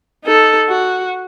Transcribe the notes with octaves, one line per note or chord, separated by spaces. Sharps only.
D#4 A4
F#4